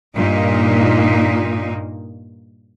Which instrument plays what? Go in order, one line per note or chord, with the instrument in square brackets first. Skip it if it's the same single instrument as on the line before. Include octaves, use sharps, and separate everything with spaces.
[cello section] G2 A#2 A#3 D#4